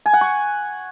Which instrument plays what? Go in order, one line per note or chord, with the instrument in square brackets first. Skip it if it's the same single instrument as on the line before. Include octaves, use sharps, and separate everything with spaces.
[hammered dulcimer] G#5
F#5
C#6